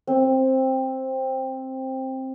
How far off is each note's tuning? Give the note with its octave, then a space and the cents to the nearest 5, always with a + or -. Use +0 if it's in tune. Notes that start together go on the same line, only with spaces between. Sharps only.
C4 +10